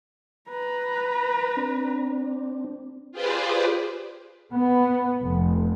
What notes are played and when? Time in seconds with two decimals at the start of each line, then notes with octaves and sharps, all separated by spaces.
0.50 B4 A#5
1.57 C4 D4
3.12 F4 G4 G#4 B4 C5 D5
4.53 B3
5.21 F1